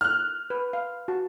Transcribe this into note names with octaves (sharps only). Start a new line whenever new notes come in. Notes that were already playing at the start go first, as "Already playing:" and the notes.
F6 F#6
B4
F5
F#4 A5